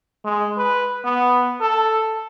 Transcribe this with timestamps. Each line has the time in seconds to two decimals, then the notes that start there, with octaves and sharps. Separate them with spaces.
0.25 G#3
0.58 B4
1.04 B3
1.61 A4